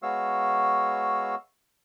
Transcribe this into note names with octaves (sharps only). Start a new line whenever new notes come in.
G#3 B3 F#4 C#5 F5 E6